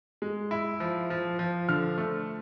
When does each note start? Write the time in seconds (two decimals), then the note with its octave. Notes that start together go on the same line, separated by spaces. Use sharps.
0.22 G#3
0.51 E4
0.80 F3
1.10 F3
1.39 F3
1.69 D3 F6
1.98 A3